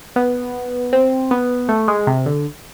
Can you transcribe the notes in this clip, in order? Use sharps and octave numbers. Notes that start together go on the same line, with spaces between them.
B3
C4
B3
A3
G#3
C3
D3